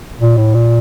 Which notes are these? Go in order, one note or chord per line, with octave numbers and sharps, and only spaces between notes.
A#2
A2
A#2